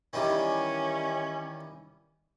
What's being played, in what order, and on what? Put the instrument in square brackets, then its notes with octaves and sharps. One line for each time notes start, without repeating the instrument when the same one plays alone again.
[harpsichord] D#3 E3 G3 [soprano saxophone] C#4